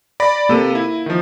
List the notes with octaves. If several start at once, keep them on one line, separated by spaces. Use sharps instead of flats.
D5 B5 A#6
C3 A#3 A4 D#7
E4
D#3 F3